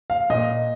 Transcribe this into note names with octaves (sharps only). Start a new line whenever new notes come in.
F5
A#2 D#5